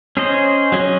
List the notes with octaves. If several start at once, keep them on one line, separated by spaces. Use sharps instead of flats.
C#4 G#4 C5 D#5
F#3 C#4 G#4 D#5